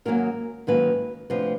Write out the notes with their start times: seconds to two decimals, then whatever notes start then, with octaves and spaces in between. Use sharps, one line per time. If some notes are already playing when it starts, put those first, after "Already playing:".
0.05 G#2 D#3 F#3 A#3 C#4 A#4
0.67 G#2 D#3 F#3 A#3 C#4 B4
1.30 D2 C3 F3 B4